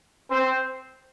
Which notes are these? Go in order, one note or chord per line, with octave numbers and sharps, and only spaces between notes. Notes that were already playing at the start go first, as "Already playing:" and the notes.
C4 C5